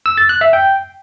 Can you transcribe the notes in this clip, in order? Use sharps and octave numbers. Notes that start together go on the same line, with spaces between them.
E6
A6
F#6
E5
G5